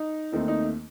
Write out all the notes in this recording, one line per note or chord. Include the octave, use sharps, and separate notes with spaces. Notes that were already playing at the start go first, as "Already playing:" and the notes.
Already playing: D#4
D#2 D#3 A3 C4 D#4
D#4